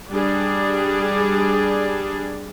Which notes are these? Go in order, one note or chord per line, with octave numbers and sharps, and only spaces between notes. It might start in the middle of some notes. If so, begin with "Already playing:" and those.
G3 D4 G#4